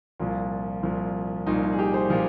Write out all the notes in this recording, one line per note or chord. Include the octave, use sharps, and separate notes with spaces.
C2 A#2 F3 F4
C2 A#2 F3
C2 A#2 F3 D#4
D#4
G#4
G4
C5
A#2 F3